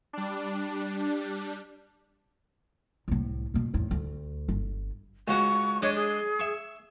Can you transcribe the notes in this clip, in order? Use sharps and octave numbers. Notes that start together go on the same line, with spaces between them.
G3 D4
C2 A2
E2 B2
E2 A2
D2
G1
C#2 F#4 F#5 C#6
G#3 D4 C#5 D#5
G#4
E5 C#6